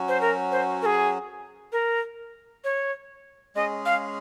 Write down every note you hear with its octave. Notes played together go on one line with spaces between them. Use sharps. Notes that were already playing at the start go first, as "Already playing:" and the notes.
Already playing: F#3 C#4 F#4
C5
A#4
C5
A#4
G#4
A#4
C#5
G#3 C#4 G#4 D#5
F5